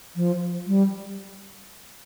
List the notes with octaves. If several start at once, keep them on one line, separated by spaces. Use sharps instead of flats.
F3
G3